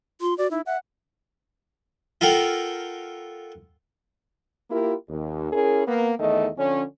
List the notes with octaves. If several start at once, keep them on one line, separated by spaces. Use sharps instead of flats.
F4 C6
F#4 D5
D#4 E4
E5 F#5
F4 A4 A#4 F#5 G5
A#3 E4 F4 G4 A#4
D#2
C#4 E4 G#4 A#4
A#3 B3
E2 D#3 A3 D#5
D3 F3 C#4